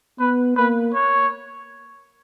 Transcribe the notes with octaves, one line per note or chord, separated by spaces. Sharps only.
B3 B4
A#3 B4
C#5